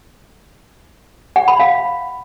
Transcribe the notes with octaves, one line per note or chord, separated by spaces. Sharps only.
F#5
B5
F5